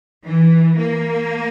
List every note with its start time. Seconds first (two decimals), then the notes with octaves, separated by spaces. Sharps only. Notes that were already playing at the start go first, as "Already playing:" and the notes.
0.24 E3
0.78 A#3